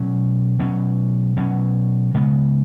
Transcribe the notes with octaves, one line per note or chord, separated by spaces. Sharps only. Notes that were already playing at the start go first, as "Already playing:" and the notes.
Already playing: B2 F#3 C#4
B2 F#3 C#4
B2 F#3 C#4
C#3 G#3 B3